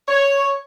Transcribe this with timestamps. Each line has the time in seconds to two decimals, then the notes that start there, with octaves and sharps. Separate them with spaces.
0.08 C#5